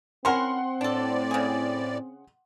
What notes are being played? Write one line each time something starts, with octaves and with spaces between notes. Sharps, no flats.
C4 C#4 E4 A#4 F#5 C6
A2 D4 A4 D5
C#3 G#4